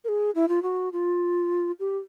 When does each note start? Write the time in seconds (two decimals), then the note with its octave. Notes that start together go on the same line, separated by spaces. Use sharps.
0.04 A#4
0.09 G#4
0.35 E4
0.49 F4
0.63 F#4
0.93 F4
1.80 G4